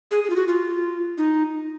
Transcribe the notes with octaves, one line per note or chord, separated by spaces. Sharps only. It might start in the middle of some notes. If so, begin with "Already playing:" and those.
G#4
G#4
F4
F#4
F4
D#4